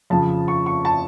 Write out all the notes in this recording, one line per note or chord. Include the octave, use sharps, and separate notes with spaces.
F2 C#3 F3 A5
C#6
C#6
A5